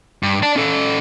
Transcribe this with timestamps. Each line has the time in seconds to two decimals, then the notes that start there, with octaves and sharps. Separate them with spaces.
0.23 G2
0.43 D5 A5
0.56 C#4 A4